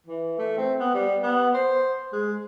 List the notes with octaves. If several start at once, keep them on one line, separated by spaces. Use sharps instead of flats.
E3
A3
C4
B3
G3
B3
C5
G#3